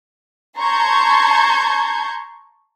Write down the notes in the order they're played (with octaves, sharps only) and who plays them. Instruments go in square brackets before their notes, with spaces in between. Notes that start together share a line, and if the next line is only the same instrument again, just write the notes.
[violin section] A5 A#5 C6 C#6 G6 G#6